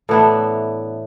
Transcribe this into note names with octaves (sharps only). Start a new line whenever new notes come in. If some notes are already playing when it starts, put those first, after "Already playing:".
A2 E3 B3 D4